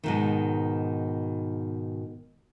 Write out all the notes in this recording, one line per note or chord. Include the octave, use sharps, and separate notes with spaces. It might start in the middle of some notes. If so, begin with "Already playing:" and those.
G#2 B2 D#3